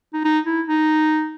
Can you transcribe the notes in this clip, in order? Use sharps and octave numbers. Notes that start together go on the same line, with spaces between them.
D#4
D#4
E4
D#4